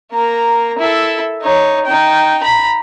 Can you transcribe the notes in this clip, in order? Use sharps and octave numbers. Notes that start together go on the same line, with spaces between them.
A#3 A#5
E4 A4
D#4 C#5
D#4 G5
A#5 B5